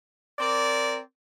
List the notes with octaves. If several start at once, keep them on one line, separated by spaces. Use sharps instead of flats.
C4 A#4 D5